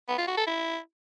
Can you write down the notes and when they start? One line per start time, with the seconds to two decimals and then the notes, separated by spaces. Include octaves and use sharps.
0.09 B3
0.18 F4
0.28 F#4
0.37 A4
0.47 E4